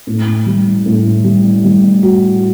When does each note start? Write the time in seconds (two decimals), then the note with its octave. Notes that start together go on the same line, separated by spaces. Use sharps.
0.07 A2
0.46 G3
0.86 A2
1.24 G3
1.64 G3
2.03 F#4